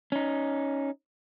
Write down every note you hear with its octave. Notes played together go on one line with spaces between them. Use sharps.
C#4 D#4